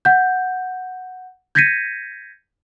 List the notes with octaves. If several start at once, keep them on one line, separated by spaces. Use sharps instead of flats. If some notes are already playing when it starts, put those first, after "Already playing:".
F#5 G6
G6 G#6 A#6 B6 C#7 D#7